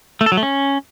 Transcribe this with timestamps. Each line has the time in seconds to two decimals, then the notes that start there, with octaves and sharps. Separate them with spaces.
0.21 A3
0.26 A4
0.32 F#3
0.37 A3
0.43 C#4